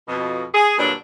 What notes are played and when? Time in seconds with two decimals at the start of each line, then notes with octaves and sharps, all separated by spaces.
0.07 F2 B2
0.54 G#4
0.78 G2 A#2 D3 F#3 D4